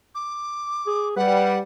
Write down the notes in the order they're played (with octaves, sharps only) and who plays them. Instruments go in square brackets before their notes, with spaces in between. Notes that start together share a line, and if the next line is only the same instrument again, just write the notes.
[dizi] D6
[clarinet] G#4
[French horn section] G3 [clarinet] B4 [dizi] F#5